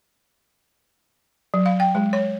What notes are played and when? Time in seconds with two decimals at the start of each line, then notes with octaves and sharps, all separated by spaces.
1.54 F#3
1.66 F5
1.80 G5
1.95 G#3
2.13 C#5